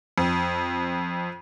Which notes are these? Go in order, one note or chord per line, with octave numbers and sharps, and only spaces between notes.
F2